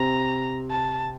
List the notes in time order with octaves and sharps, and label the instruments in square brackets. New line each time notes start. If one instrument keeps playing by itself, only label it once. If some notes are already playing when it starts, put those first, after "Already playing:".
Already playing: [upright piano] C3 C4 [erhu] A#5
[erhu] A5